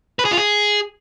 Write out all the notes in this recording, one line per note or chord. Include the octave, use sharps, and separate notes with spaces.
B4
G#4
F4
G#4